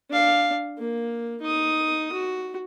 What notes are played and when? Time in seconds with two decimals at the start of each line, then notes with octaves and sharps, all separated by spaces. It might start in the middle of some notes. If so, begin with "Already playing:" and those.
0.10 D4 F5
0.78 A#3
1.41 D#4 D#6
2.12 F#4